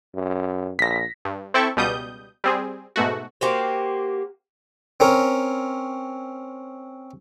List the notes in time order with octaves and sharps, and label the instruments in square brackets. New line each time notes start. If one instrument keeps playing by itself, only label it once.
[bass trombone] F#2
[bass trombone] A#1 [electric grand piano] A#6 B6
[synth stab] G2
C4 E4 A4 G5 C#6
C#2 B2 G3 D#6 G6
G3 C4 G#4
G#2 B2 A3 F#4
[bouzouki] A#3 F#4 G4 C5
[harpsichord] C4 C#4 A#4